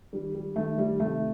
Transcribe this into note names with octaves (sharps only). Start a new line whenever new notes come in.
D#3 G3
G3
D#3 A3
G3
C3 A3